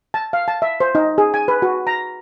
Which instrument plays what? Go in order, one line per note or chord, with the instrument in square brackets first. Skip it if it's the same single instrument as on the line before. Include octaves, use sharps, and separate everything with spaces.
[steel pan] A5
F5
A5
E5
C5
D#4
G#4
G#5
B4
F#4
A#5